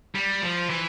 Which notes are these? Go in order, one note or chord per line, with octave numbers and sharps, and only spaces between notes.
G3
F3
E3